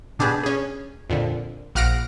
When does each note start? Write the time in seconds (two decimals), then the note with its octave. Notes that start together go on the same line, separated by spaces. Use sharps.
0.19 B2 D4 G4 G#4 B4
0.43 C#4 G#4
1.10 F2 A#2 D3
1.75 A#1 F5 F#5 F6 A#6 D7